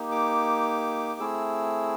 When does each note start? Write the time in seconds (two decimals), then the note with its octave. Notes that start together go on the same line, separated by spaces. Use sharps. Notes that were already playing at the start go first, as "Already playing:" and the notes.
Already playing: A#3 D#4 G4
0.12 D6
1.20 A3 C4 E4 G#4 E6